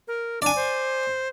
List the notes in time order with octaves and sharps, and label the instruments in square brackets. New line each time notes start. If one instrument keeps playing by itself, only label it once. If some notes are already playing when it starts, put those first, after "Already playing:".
[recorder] A#4
[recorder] D4 [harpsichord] D5 G#5
[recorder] C5